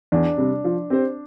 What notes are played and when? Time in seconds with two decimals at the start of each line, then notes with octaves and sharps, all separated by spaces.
0.12 E2 D4
0.37 C3 G3
0.64 F3
0.90 C4 G4 C5